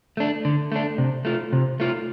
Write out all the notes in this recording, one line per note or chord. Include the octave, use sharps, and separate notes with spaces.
A3 D4
D3
A3 D4
C3
A3 F4
C3
A3 F4